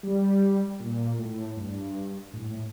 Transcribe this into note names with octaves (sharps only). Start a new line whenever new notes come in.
G3
A#2
A2
G2
A2
A2